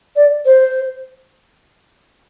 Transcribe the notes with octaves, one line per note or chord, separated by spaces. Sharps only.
D5
C5